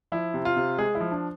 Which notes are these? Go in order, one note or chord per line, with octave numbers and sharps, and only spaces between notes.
F3 E4
C3
F4
C3
G#3 G#4
E4
F3
D4